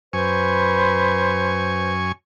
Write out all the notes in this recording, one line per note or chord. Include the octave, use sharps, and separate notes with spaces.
F#2 B4 C5 G#5 C#6